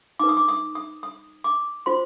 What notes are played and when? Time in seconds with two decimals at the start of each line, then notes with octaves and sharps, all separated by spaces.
0.19 D#4 B4 D6
0.29 D#6
0.37 D6
0.48 D#6
0.75 D#6
1.03 D#6
1.44 D6
1.86 F4 C5 C6